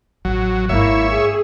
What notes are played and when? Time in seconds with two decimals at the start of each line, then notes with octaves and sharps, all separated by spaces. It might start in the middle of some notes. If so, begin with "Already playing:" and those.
0.25 A1 F#3
0.69 G#1 A#3 E4 C#5 E5
1.10 G#4